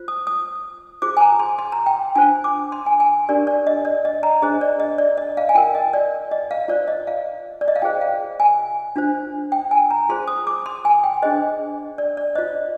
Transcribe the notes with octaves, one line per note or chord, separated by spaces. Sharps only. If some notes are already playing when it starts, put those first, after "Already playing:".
Already playing: F4 C5
D#6
D#6
F4 G#4 C5 D6
G#5
A#5
C6
C6
A#5
G5
D4 F4 C5 G#5
D6
C6
G#5
G#5
D4 G4 A#4 D5
D5
D#5
D5
D#5
A#5
D4 G#4 C5 D#5
D5
D#5
D5
D#5
F5
G#5
F4 A#4 G5
D#5
D5
D#5
F5
F4 C5 D5
D#5
F5
D5
D#5
F5
F4 G#4 C5 G5
F5
G#5
D4 F4 C5
G5
G#5
A#5
F4 G#4 C5 C6
D#6
D6
C6
G#5
G5
D4 G#4 C5 D#5
D5
D5
F4 C5 D#5